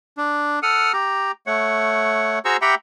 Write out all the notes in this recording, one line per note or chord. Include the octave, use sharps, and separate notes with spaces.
D4
A4 F#5 D#6 F6
G4 A#5
A3 C#5 F#5
F#4 G#4 C5 A#5 C#6 E6
G4 E5 F#5 G5 A#5 B5